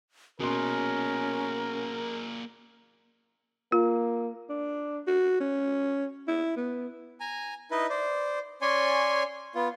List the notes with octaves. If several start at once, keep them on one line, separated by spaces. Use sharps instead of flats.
B2 A#3 C#4 G#4 A#4 C6
A#3 F4
D4
F#4
C#4
E4
B3
G#5 A#5
D#4 E4 B4 D#5
C5 D5
C#4 C#5 D5 G#5 C6
B3 F4